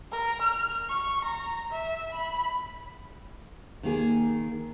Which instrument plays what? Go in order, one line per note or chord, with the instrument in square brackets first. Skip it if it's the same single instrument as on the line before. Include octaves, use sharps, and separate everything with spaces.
[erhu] A#4
F6
C#6
A#5
E5
B5
[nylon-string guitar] D#3 A#3 G#4